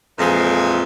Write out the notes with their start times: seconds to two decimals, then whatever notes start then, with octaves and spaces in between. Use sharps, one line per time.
0.19 F2 A#2 E3 F3 G#3